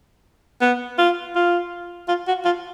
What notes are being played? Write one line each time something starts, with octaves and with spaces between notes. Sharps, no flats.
B3
F4
F4
F4
F#4
F4